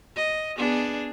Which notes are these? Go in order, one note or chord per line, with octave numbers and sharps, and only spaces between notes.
D#5
B3 D4 G#4